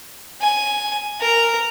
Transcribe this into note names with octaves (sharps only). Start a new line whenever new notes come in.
G#5
A#4